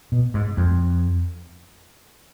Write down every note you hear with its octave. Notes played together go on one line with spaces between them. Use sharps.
B2
G#2
F2